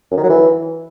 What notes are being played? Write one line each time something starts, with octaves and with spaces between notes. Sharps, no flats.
F#2
D#3
F#3
E3